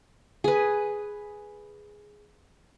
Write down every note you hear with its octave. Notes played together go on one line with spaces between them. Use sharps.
G#4 B4